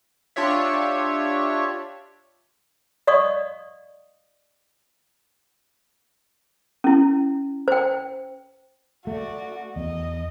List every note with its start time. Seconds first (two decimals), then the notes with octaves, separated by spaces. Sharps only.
0.36 D4 F4 G4 C#5 E5
3.07 D5 D#5 F5 C#6 D#6
6.84 C#4 E4
7.68 C5 G5
9.07 A3 F#4 D5
9.76 E2 D#5